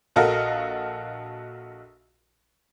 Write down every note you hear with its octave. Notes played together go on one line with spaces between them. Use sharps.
A#1 F#4 A4 A#4 D#5 F5